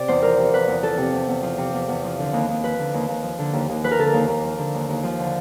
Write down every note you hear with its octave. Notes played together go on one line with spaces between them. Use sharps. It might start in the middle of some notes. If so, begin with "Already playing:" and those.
Already playing: C3 D5
E2 C5
F3 A#4
C3
E2 B4
E2
F3 A4
C3
E2
E2
F3
C3
E2
E2
F3
D3
D#2
D#2
F3 B4
D3
D#2
D#2
F3
D3
D#2
D#2
F3 B4
A#4
D3 A4
A#4
D#2
D#2
F3
D3
D#2
D#2
F3
D3